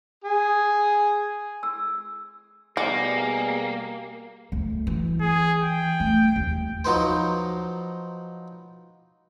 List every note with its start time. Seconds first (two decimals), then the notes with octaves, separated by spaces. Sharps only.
0.24 G#4
1.63 E6
2.77 B2 G3 A#3 G#4 A#4 D5 F#5
4.52 D2
4.87 E3
5.21 G#4
5.62 G5
6.00 A3
6.36 D#2
6.85 F3 F#3 D#4 B4 C5